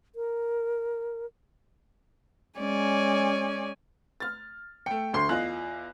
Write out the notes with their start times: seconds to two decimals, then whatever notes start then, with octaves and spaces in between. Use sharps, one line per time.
0.15 A#4
2.59 G#3 C#4 C#5 D5 G#5
4.20 F6 A6
4.86 A3 G5 C#7
5.13 D2 C6 C7
5.29 E2 F4 D#5 F#6